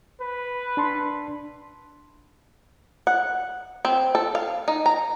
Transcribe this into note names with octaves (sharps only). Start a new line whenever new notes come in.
B4
D4 A5 C6
F#5
C4
A4
F5
D#4
A#5